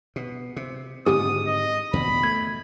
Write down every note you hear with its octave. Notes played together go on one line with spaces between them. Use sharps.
B2
C3
G#2 D3 D#3 C4 G4 G#4 D#6
D#5
E2 B2 D#3 B5
A3 G#6